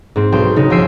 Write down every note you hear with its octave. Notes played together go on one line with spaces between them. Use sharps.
G#2 C4
B1 G5 C6
C#3 D#4 F#4
G1 F3 G5 G#5 E6 C7